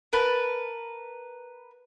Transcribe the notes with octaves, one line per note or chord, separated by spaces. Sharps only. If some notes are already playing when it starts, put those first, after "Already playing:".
A#4 B4 A5